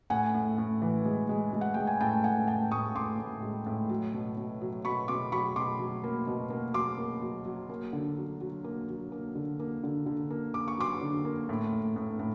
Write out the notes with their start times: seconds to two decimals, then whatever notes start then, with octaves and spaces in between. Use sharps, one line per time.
0.10 A2 F#5 G#5
0.35 A2
0.58 A2
0.82 E3
1.05 G#3
1.29 G#3
1.53 G#3
1.61 F#5
1.74 G#3 G5
1.87 G#5
2.01 A2 G5 A5
2.24 A2 F#5 G#5
2.48 A2 G5 A5
2.71 A2 C#6 D#6
2.95 A2 C6 D6
3.19 A2
3.43 G#3
3.66 A2
3.89 F#3
4.14 B2
4.37 B2
4.61 F#3
4.85 B2 B5 C#6
5.08 B2 C6 D6
5.32 F#3 B5 C#6
5.56 B2 C6 D6
5.79 F#3
6.04 A#3
6.27 B2
6.50 A#3
6.74 F#3 C6 D6
6.98 A#3
7.22 F#3
7.45 F#3
7.69 A#3
7.93 D3
8.17 F#3
8.41 F#3
8.64 A#3
8.88 F#3
9.12 A#3
9.35 D3
9.60 A#3
9.83 D3
10.06 D3
10.30 A#3
10.54 A#3 D6
10.68 C#6
10.78 F#3 C6 D6
11.01 D3
11.25 A#3
11.49 A2
11.73 A2
11.96 A2
12.19 A2